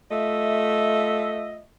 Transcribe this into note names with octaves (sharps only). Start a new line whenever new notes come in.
A3 F4 D#5 E5